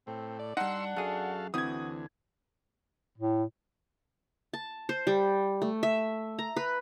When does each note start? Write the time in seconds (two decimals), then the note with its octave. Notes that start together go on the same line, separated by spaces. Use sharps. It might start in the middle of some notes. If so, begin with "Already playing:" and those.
0.07 A2 C4
0.39 D5
0.57 G2 D4 D#4 F#5 C6 E6
0.96 F#2 F#4 G#4 A4 F5
1.54 D2 E3 C4 F#4 D#6 G#6
3.18 A2
4.53 A5
4.89 C5
5.07 G3
5.62 A3
5.83 E5
6.39 A#5
6.56 B4